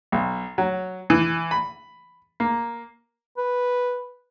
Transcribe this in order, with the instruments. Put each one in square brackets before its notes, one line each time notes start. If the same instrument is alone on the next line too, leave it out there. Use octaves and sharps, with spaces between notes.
[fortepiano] B1
F#3
E3
B5
A#3
[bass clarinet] B4